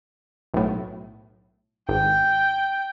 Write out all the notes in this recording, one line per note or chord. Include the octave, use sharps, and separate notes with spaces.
B1 A2
G#1 G5